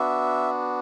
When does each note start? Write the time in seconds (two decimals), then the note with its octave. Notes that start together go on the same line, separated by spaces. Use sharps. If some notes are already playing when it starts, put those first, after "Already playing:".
Already playing: B3 D4 F#4 E5